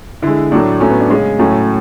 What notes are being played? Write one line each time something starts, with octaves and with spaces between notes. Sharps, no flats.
D3 G#3 E4
A2 F#3 A3 D4
A2 F#3 A3 C#4
B3
D4
C#3 G#3 C#4
A2 F#3 A3 C#4